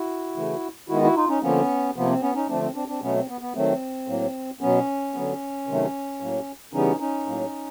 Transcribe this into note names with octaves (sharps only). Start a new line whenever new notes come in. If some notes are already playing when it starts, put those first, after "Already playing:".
Already playing: E4 F#4
C#3 E3 A3
D#3 G#3 B3 E4 F#4
E4 F#4
D#4 F4
C#4 D#4
D3 F3 A#3 B3 C#4
C3 F3 A#3 B3
C4
B3 C#4
C#4 D#4
D3 F3 A3 C4 D4
C4
C4 D4
C4 D4
B2 F#3 A3 B3 C#4
C4
B3
B3
D#3 F#3 A3 C4
A2 F#3 A#3
B2 F#3 B3 C#4
D3 F#3 B3
C3 D#3 F#3 A3
A2 F#3 A#3
C#3 E3 G3 B3 C#4 D#4
C#4 D#4
A2 F#3 A#3